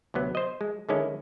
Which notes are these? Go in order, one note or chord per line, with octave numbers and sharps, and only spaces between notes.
D2 C3 F#3 B3
C5 D#5
G#3
D3 D#3 G#3 C#4 E4